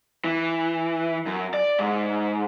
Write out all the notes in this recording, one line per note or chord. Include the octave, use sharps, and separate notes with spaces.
E3
F#2
D5
G#2